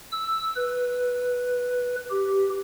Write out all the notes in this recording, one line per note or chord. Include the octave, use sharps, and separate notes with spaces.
E6
B4
G4